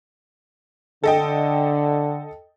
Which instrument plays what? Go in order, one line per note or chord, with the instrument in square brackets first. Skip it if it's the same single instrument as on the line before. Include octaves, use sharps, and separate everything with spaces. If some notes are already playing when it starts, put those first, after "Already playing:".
[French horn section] D3 [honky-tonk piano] A4 D#5 G5